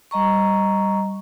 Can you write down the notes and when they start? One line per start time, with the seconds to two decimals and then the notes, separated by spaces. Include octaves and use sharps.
0.11 G3 D#5 A#5 C#6